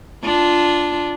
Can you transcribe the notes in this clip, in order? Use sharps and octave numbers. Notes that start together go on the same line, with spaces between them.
D4 F4